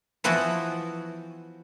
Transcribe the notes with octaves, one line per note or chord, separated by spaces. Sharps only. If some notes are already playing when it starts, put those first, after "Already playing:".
E3 F3 B3 E4 F#4